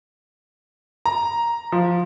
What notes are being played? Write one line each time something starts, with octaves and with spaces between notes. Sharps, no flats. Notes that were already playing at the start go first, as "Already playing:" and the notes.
A#5
F3